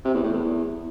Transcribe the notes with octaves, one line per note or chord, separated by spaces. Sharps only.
C3
E2
A2
E2